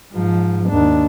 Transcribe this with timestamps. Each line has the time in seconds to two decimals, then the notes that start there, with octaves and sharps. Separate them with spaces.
0.13 G#2 F3
0.69 D#2 D4